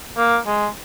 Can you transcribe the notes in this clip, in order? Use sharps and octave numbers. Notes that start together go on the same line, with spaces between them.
A#3
G#3